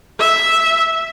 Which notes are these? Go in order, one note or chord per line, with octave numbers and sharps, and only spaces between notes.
E5